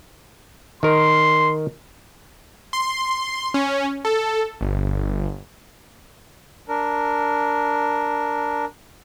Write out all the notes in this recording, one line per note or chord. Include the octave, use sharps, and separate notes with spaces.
D#3 A#4 C6
C6
C#4
A4
G1
D4 A#4